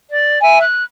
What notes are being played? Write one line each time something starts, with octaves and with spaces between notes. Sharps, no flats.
D5
E5 G#5
F#6